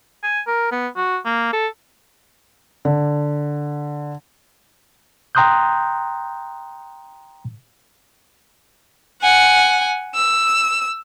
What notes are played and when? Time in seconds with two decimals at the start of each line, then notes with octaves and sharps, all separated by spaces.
0.23 G#5
0.47 A#4
0.72 B3
0.96 F#4
1.25 A#3
1.53 A4
2.85 D3
5.35 G5 A#5 C6 D#6 F#6 G6
9.22 F#5 G#5
10.15 E6